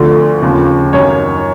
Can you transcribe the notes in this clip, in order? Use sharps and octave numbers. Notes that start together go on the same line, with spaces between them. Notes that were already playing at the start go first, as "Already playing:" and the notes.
Already playing: D2 D3 F3
D#2 C#3 F3
F#2 D#3 C#5